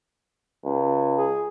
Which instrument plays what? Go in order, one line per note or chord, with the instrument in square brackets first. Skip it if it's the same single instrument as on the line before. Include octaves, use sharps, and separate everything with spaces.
[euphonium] C#2
[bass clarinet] G#4